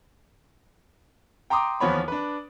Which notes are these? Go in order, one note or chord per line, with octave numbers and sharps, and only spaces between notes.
G5 A#5 C6 D6 D#6
D#2 E3 F3 B3 C#5 B5
D4 B4